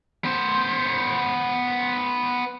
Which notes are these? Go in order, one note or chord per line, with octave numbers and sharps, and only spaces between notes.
B3 C5